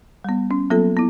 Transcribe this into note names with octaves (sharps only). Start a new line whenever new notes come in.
G3 B3
C#4
F#3 A#3 B3 F4 A4
B3 E4